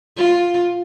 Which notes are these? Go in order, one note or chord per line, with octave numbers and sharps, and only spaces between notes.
F4